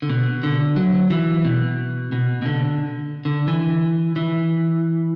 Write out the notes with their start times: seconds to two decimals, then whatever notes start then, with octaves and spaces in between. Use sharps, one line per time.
0.02 D3
0.09 B2
0.43 D3
0.76 F#3
1.10 E3
1.45 B2
2.12 B2
2.42 B2
2.46 D3
3.25 D3
3.48 E3
4.16 E3